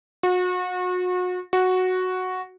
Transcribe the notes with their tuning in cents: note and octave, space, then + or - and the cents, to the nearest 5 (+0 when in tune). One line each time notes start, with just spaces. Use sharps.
F#4 -35
F#4 -5